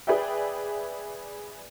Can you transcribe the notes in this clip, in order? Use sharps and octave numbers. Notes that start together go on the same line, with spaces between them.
G#4 B4 D5 E5 G5